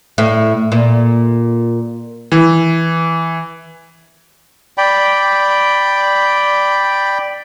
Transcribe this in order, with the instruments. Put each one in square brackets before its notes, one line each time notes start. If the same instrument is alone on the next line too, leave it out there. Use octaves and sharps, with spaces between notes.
[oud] A2
A#2
[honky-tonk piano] E3
[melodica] D5 G5 B5